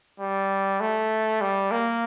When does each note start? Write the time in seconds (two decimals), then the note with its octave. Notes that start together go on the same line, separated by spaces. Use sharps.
0.20 G3
0.80 A3
1.41 G3
1.71 A#3